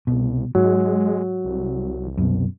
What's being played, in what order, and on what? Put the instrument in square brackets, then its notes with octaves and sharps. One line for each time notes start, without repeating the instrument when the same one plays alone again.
[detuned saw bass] C2 [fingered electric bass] B2
[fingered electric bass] G#2 [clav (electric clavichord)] F#3 [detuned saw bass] G#3
[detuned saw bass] C2
[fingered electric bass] F#2 B2